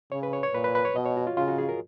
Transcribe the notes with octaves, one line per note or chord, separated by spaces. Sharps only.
C#3 C#5
B4
C#5
C#5
A#2 B4
B4
B4
C#5
B2 D#5
C#5
F#4
F4
C#3 F4
F#4
G#4
A#4